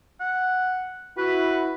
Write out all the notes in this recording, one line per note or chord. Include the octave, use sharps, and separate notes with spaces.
F#5
E4 F#4 B4